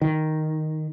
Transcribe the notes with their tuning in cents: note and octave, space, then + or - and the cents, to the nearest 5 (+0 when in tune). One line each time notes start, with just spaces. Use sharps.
D#3 +0